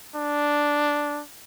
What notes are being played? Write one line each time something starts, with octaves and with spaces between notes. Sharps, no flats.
D4